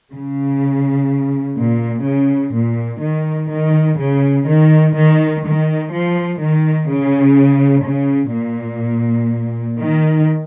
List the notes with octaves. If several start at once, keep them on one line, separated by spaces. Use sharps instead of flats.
C#3
A#2
C#3
A#2
D#3
D#3
C#3
D#3
D#3
D#3
F3
D#3
C#3
C#3
A#2
D#3